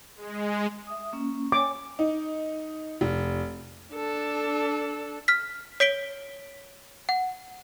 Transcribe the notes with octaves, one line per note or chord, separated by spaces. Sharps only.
G#3
E5 D#6
A#3 C#4
C#5 G#5 D6
D#4
F1
D4 A4
F6 B6
C#5 B6 D7 G7
F#5